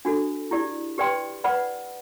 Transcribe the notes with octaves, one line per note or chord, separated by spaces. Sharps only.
D4 F#4 A4
E4 G4 D5
G4 B4 D5 G5 C6
B4 D5 F#5 B5